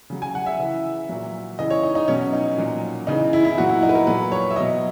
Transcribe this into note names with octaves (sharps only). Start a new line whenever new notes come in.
C#3 F#3
G#5
F#5
E5
C#3 E3
A#2 F#3
C#3 E3 D#5
C#5
D#4
D#4
B2 F#3 C#4
D#4
A#2 F#3
C#3 E3 D#4
E4
E4
A#2 F#3 F#4
E4
D#4
B4
A#4
A#2 F#3 B4
C#5
E5
B2 F#3 D#5